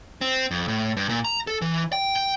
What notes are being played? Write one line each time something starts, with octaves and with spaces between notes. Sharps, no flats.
C4
F2
A2
G2
A#2
A#5
A4
E3
G5
G5